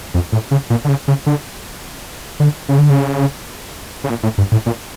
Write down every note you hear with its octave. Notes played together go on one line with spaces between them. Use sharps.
F2
A2
C#3
A#2
D3
C#3
C#3
D3
D3
C#3
D3
C#3
C#3
A#2
A2
G2
A2
A#2